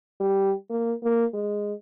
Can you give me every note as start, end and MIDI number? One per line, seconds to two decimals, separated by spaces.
0.21 0.52 55
0.70 0.93 58
1.03 1.25 58
1.34 1.73 56